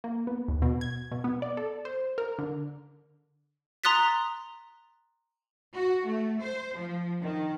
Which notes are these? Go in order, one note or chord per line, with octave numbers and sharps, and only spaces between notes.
A#3
B3
D#2
B2
G#6
B2
B3
D5
A4
C5
A#4
D3
A#5 C6 D#6 F#6 A6 B6
F#4
A3
C5
F3
D#3